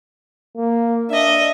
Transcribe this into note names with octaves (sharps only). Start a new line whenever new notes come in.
A#3
D4 D#5 E5